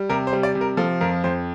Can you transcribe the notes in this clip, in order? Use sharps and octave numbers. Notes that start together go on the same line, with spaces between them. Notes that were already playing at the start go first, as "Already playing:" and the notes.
Already playing: G3
C3 A#4
C5
G3
D5
C3
A#4
F3 A4
F2 A#4
F2 C5